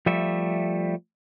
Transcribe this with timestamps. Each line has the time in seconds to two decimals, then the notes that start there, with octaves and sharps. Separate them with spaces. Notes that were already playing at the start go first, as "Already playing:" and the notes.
0.06 F3 G3 A3 E5